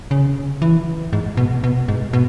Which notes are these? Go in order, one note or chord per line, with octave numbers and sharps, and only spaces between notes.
C#3
E3
G#2
B2
B2
G#2
B2